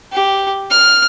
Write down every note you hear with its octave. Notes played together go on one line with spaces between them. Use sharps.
G4
F6